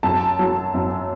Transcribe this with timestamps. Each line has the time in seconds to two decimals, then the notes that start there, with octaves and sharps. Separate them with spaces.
0.03 F#2 A5
0.39 F#3
0.74 F#2